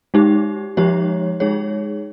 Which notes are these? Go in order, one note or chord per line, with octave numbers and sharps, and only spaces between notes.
G#3 D#4 G4
F3 G#3 D#4 G4 C#5
G#3 D#4 G#4 C#5